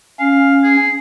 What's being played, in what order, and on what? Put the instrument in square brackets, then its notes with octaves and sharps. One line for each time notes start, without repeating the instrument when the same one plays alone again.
[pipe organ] C#4 [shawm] F5
[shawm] G#4